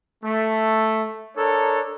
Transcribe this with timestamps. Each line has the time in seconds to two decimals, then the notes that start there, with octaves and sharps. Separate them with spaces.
0.24 A3
1.36 D4 A4 A#4 C#5